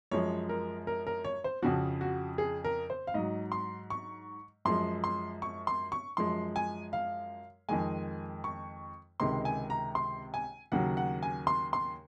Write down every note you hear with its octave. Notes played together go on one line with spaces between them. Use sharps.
F#2 F3 G#3 C#5
A#4
A#4
A#4
C#5
C5
F2 C#3 F3 F#4
F#4
G#4
A#4
C5
F5
G#2 F#3 D#5
C6
C#6
F#2 F3 G#3 C6
C6
C#6
C6
C#6
F#2 F3 G#3 C6
G#5
F5
F2 D#3 G#3 G#5
C#6
C#2 C3 D#3 G#3 C6
G#5
A#5
C6
G#5
D#2 C#3 F#3 F#5
F#5
G#5
C6
C6